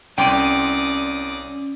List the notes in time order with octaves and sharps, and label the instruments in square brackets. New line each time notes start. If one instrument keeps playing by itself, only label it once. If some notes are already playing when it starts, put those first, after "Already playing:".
[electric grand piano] C2 C6 D#7 [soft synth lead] C#4 [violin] D5 D#6 [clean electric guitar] G5